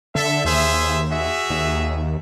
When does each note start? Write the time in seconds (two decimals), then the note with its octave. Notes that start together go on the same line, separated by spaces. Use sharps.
0.15 D3 A4 E5
0.45 D#2 G#4 C5 E5
1.10 F#4 G#4 E5
1.50 D#2